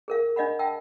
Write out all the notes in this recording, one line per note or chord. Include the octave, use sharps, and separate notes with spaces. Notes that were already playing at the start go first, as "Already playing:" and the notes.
G#4 A#4 F5
D4 D#5 F5 F#5 B5
F5 G5 A5 E6